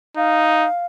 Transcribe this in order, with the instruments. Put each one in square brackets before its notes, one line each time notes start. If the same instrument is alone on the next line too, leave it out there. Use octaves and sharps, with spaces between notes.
[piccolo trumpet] D#4 [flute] F5